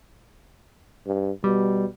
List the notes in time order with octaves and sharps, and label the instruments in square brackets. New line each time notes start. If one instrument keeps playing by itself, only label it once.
[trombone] G2
[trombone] B2 [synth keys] G3